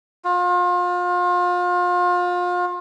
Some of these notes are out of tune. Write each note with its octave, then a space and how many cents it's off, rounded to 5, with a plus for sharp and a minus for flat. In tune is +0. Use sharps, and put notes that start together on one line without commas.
F4 +35